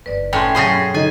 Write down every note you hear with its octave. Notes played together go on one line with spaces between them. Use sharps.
F#1 D#4 B4 D5
A2 C#4 C#5 G5 C6
G2 B2 F#3 C#4 G#4 C5
D3 D#4 A4 G#5